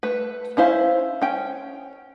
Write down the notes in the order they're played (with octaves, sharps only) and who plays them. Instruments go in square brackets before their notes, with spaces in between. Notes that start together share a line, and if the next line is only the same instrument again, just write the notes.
[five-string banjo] A3 B4
C#4 E4 C5 F5
C#4 G5